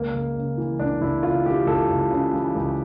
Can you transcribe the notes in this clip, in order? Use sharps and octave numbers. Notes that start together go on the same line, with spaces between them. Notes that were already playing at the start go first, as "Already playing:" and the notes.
Already playing: C#2 A#3
C#2
C#3
E3
C#2 D4
C#2 E4
C#3 F4
E3 G4
C#2 A4
C#2
C#3
E3
C#2